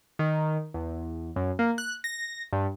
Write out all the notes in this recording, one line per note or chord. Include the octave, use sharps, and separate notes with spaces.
D#3
E2
F#2
A#3
F#6
A#6
G2